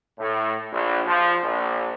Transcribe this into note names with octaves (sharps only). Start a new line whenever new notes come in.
A2
A#1
F3
A#1